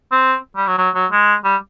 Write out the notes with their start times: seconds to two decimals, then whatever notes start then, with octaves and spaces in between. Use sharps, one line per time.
0.12 C4
0.56 G3
0.67 F#3
0.78 F#3
0.95 F#3
1.12 G#3
1.44 G3